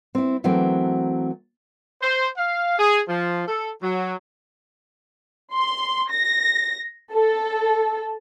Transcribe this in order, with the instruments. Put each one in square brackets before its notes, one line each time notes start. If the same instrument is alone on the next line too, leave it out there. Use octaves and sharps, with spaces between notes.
[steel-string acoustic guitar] C4 E4
E3 F#3 A3 C4 A#4
[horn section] C5
F5
G#4
F3
A4
F#3
[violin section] C6
A#6
A4